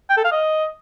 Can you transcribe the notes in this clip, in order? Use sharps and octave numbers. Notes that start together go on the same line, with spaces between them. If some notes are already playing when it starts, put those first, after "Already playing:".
G5
A4
F5
D#5